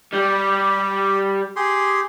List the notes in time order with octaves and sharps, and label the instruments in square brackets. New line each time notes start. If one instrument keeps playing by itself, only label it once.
[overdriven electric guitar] G3 [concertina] G4
[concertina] G4 G#4 C6